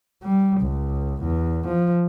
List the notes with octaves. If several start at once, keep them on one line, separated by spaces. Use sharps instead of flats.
G3
C#2
E2
F3